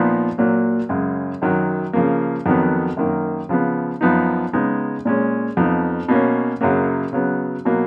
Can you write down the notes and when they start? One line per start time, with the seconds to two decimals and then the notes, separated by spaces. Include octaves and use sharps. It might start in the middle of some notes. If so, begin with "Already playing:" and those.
Already playing: A#2 F3 B3 D#4
0.38 A#2 F#3 A#3
0.89 F#2 C#3 G#3
1.42 F#2 D#3 F#3
1.93 C#3 F3 A#3
2.46 F2 D#3 F#3 B3
2.97 F#2 D#3 A#3
3.49 C#3 F3 B3
4.01 F#2 F3 B3 D#4
4.53 C#3 G#3 B3 D#4
5.05 A#2 G#3 C#4
5.57 F2 F3 B3 D#4
6.08 B2 A#3 C#4
6.61 F#2 C#3 F#3 A#3
7.13 C#3 F#3 B3
7.65 B2 F#3 A#3